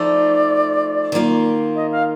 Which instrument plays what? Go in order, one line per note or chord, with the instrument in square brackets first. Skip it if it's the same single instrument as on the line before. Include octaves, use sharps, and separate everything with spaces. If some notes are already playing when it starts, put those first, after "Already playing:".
Already playing: [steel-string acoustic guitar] F3 A3 D#4 [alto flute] D5
[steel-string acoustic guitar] D#3 A#3 F4
[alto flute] D#5
F5